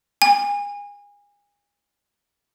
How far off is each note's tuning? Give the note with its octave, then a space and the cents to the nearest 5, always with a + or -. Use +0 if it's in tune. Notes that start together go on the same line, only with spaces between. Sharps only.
G#5 -30